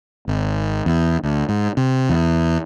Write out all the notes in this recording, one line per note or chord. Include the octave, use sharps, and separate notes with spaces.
G#1
E2
D2
G#2
C3
E2